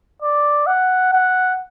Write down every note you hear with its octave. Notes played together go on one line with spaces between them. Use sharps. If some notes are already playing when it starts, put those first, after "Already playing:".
D5
F#5
F#5